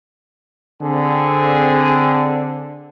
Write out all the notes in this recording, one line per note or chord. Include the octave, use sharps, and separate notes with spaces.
D3 C4 G#4